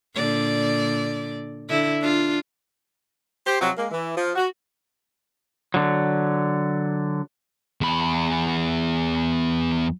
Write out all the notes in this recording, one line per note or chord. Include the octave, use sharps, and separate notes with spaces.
A#2 D3 D5
D3 E4
D4 F4
G4 C5
C3 F3 F#3
G#3 A#3
E3
F3
F#4
D3 F#3
E2 B5